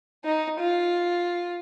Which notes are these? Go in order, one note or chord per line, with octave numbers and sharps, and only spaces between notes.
D#4
F4